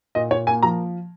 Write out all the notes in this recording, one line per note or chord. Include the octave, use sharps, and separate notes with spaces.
A#2 D#5
A#2 C#5
A#3 G#5
F3 A#5